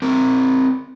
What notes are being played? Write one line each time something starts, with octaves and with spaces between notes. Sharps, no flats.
C4 A#4